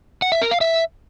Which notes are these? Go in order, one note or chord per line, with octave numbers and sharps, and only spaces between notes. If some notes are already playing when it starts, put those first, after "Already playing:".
F#5
E5
A#4
F5
E5